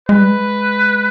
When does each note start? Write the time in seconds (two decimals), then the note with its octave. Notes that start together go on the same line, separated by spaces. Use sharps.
0.09 G#3 B4
0.18 G3
0.28 G#3